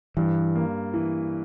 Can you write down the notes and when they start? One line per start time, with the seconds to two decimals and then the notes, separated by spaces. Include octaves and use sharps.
0.17 G2 E3
0.55 A#3
0.94 E3